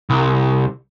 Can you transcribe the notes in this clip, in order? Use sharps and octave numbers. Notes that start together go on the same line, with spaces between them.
C2